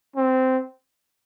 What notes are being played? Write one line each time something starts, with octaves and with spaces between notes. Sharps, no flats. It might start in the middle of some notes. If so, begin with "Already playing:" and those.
C4